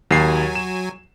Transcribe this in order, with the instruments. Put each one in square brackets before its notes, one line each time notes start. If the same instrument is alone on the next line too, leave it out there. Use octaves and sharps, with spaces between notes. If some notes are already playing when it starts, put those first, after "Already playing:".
[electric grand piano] D#2 C7 [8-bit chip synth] F#3 G#5
[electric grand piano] E7